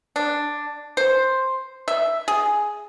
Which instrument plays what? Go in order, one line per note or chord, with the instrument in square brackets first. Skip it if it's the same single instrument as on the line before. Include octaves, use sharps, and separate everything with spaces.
[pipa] D4
C5
E5
G#4